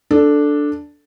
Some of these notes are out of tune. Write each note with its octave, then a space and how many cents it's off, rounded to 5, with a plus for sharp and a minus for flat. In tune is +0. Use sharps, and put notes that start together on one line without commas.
D4 +0 A4 +0